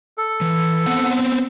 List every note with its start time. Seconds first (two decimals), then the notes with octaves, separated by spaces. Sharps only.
0.18 A4
0.41 E3
0.86 B3 C4 F#5